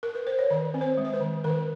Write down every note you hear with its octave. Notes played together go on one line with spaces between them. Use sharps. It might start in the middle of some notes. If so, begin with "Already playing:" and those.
A#4
B4
C5
C#5
D#3 D5
C4
C5
G#3
C5
B4
D#3
D#3 A#4